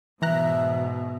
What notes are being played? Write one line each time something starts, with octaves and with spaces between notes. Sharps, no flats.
G#2 B2 E3 E5 A#5 F#6